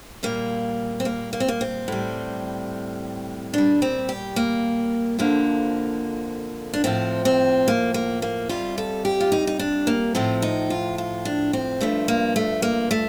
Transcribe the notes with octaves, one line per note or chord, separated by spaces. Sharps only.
A#2 G3 A#3
C4
A#3
A#3
C4
A#3
C4
A2 G3
A#2 G3 D4
C4
G4
A#3
F2 D3 F3 A#3
D4
A2 F3 C4
C4
A#3
A#3
A#3
F2 C3 G3 F4
A4
G4
F4
D#4
D#4
D4
A#3
A2 F3 C4
D#4
F4
F4
D4
C4
G2 F3 A3
A#3
A3
A#3
A3